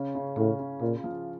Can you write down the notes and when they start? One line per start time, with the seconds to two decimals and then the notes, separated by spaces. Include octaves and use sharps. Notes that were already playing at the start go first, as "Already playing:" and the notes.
Already playing: C#3 C#4
0.15 C#3
0.37 A2 C#3
0.59 C#3
0.81 A#2 F4
1.04 F3